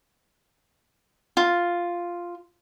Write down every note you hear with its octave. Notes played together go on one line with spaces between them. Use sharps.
F4